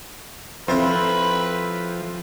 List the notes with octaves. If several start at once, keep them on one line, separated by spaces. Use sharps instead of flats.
F2 F3 C4 E4 F4 B4